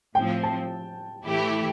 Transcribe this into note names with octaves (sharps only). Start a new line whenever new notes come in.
A2 F3 C4 G5
A5
A2 E3 A3 E4 G4